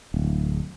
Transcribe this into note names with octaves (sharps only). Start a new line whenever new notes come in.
D1